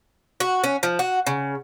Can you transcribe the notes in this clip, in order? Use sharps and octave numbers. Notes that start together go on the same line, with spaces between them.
F#4
C#4
F3
F#4
C#3